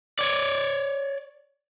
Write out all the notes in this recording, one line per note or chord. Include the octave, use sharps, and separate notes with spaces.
C#5 D5